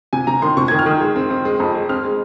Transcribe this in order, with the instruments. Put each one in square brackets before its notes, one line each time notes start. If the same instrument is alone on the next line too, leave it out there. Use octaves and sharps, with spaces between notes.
[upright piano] C3 G#5
C3 A#5
D#3 C6
C3 C#6
D#3 G#6
F6
D#3
G#3
C4
C4
G#3
F2
G#3
C4 F6
G#3